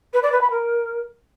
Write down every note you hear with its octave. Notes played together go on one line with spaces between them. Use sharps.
B4
D5
B4
B5
A#4